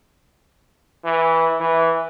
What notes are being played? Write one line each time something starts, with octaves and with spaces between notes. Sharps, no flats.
E3
E3